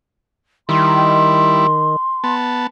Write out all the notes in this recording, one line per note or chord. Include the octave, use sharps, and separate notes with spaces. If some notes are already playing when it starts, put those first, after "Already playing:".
D#3 G3 E4 C6
B3 A5